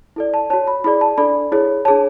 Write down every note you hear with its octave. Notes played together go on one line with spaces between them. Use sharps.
E4 A4 D5
A5
F#4 C#5 A5
B5
E4 G#4 D5 B5
A5
D4 A4 D5 B5
E4 G#4 C#5
D4 G#4 C#5 A5